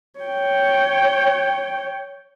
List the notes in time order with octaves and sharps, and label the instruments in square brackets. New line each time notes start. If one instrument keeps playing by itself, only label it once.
[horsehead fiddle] C#5 G5